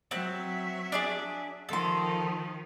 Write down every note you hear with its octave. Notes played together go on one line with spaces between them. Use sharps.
F#3 C4 E5 F#6
D4 G#4 D5
D#3 F3 A4 C6